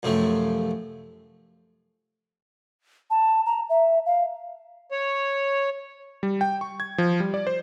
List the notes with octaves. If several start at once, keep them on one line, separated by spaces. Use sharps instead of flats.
F#2 C3 F3 A3
A5
A#5
E5
F5
C#5
G3
G5
C#6
G#6
F3
G3
D5
C5